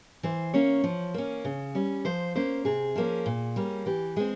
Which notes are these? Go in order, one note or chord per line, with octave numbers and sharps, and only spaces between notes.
E3 C5
A#3 C#4 C#5
F3
A#3 C#4
C#3
G3 C#4
F3 C5
A#3 C#4 C5
C3 G#4
F3 A#3 C#4
A#2
G3 A#3 C#4
E3 G4
G#3 C4 G#4